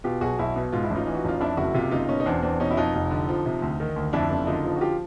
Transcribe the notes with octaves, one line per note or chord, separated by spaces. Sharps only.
B2 F4 G4
B1 F#4 G#4
B1 E4 F#4
B2
G#2 F4
E4
A1
D#4 F4
E3
F#4
A1 F4
F2 D4 E4
F#1 E4 F#4
C3 F4 G4
F#1 D#4 F4
B2 C#4 D#4
D#4
E2 C4 D4
E2 C4 D4
B2 C#4 D#4
E4
F2 D#4 F4
F1
D3
F3
C3
D2
D#3
D2
F2 D4 E4
F#1
D3 D#4 F4
F3
F#4
F4 G4